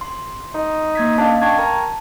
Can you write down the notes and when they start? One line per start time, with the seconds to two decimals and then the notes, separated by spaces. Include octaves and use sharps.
0.01 C6
0.54 D#4
0.95 A#3 G#6 B6
1.18 C#4 D4 D#5 F5
1.42 D4 G5 C#6 G#6
1.58 A#4 A5